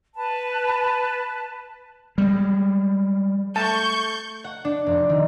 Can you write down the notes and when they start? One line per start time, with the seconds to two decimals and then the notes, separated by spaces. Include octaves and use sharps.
0.15 B4 A5
2.18 G3 G#3
3.56 A3 A5 C#6 G6
4.44 F#5
4.65 D4
4.86 F1
5.09 D#3